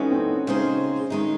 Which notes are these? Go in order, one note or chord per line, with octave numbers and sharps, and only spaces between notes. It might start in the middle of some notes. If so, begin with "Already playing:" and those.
Already playing: E3 G#3 C#4 D#4 F#4 A4
C4
C#4
C#3 G#3 C#4 D#4 G#4 C5
D#3 G#3 D#4